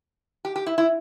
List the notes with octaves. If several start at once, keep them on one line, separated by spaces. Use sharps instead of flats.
G4
G4
E4
E4